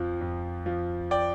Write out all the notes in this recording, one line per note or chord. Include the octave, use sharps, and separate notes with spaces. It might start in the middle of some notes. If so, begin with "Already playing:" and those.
Already playing: F2 F3
F2
F3
D5 G5